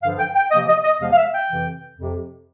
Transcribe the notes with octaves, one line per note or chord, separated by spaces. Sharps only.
G2 D3 F3 F5
G5
G5
C3 F3 A#3 D#5
D#5
D#5
E2 C3 F3 G#3 B3 F5
F5
E5
G5
F2 C3 E3
F2 C3 F3